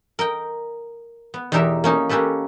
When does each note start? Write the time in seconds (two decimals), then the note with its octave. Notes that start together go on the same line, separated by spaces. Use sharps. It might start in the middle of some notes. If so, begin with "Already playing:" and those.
0.19 A#4 D#5 G5
1.34 B3
1.52 E2 B2 D#4 G4 A#4 E5
1.84 A#3 C#4 D#4
2.09 A#3 C#4 G4 A4 B4